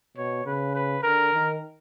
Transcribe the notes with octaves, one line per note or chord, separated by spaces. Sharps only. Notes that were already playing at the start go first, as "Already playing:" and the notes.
B2 C#5
C#3 B4
B4
D3 A#4
D#3